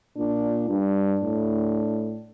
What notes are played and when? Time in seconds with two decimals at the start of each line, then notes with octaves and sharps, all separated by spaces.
0.17 A#2 D4
0.69 G2 D4
1.21 A2